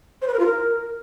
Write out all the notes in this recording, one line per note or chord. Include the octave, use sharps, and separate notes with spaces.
C5
B4
A#4
F4
A#4